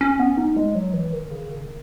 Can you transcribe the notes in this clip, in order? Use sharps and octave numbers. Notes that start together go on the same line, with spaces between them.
C#4
B3
D#4
G#3
F#3
E3
D#3
C#3
D#3